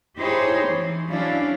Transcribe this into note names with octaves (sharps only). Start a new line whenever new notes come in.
D#4 E4 G4 G#4 C5 C#5
E3
F#3 C#4 D4 E4 F5